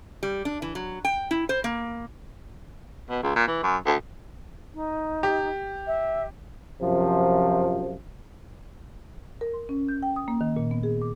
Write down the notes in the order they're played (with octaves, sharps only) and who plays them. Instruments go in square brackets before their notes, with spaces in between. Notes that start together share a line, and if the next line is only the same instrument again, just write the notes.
[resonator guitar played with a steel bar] G3
D4
E3
F#3
G5
E4
C5
A#3
[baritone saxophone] B2
C#2
A#2
E3
F#2
D2
[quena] D#4
[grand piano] G4
[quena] E5
[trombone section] F#2 C3 F3
[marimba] A#4
C6
C#4
G6
G5
D#6
A#3
D#3
A#2
B3
G#4
D6